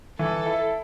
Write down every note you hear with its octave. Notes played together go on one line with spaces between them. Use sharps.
E3 A4
E4